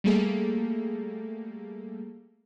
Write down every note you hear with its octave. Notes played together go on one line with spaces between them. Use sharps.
G3 A3 A#3 G#4 A4